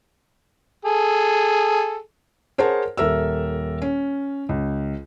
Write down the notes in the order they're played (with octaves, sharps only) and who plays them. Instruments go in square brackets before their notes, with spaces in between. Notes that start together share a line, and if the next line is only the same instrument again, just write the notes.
[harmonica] G#4 A4
[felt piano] G#4 A#4 C5 C#5 F#5 A5
D#1 A4 A#4 E5 E6
C#4
C#2